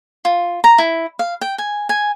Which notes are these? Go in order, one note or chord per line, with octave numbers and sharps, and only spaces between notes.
F4
A#5
E4
F5
G5
G#5
G#5